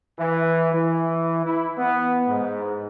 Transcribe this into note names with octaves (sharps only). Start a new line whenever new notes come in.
E3
E3
E4
B3
G#2